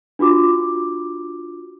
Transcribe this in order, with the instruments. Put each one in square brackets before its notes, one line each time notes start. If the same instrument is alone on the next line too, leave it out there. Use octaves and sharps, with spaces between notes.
[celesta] D4 F4 F#4 D6